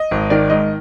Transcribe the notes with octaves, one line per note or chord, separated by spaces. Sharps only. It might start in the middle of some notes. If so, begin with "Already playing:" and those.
Already playing: D#5
G#1
D#3 D5
G#2 D#5